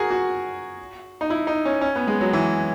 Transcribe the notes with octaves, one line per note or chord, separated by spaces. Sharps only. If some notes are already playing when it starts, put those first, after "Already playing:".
Already playing: F#4 G#4 A#4
F#4
D#4
E4
D#4
C#4
C#4
B3
G#3
F#3
E3